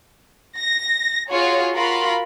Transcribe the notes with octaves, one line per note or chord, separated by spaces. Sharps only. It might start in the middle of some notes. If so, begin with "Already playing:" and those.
A#6
F4 F#4 G#4 C#5
F4 F#4 A#4 B5 C6